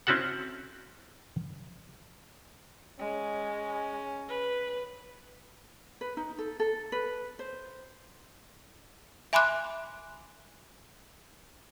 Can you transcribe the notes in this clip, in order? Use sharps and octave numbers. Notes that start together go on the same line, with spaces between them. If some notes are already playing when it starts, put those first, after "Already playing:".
C4 C#4 E4 F#4 A4 F#5
G#3 C#4
B4
B4
D#4
A4
A4
B4
C5
E5 G#5 B5 C6 D6 F#6